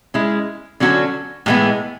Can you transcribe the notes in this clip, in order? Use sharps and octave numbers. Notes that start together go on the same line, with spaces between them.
G#3 C#4 E4
D3 F#3 C#4 F#4 A4
A2 E3 G#3 B3